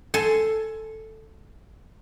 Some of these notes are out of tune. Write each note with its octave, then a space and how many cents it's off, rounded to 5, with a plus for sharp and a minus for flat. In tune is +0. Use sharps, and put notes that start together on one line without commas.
A4 +0 G#5 +15 C6 +0